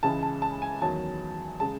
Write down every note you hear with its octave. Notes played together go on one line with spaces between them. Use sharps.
C#2 C#3 E3 G#3 A5
A5
A5
G#5
E2 D#3 F#3 A5
C#3 G#3 A5